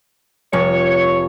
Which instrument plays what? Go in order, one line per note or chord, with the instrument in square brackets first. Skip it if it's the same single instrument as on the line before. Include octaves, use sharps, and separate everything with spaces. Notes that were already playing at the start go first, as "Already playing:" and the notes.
[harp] F1 [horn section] C#5